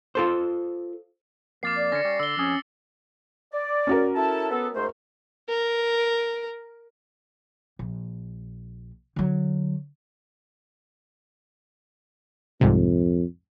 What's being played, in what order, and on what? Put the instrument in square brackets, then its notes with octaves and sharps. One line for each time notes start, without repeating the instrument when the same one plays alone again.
[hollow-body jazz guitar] F4 A4 C5
[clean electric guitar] F2 A#3 [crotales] D6 A6 C7
[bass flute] D5
[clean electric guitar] D3 C#4 [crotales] A#6 C#7
[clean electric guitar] G3 C#4
[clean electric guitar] D3 [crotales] E6 G7
[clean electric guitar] F2 G#4 [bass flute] C#4
[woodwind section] D5
[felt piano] C#4 F#4 A#4
[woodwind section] E4 A4 A5
B3 A4
G#2 A3 C5
[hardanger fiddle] A#4
[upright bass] A#1
D3 F#3
[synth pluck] C2 G#2 C3 [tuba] F2